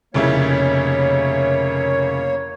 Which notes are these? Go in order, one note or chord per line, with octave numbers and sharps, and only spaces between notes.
F1 C#3 A#3 E4 C#5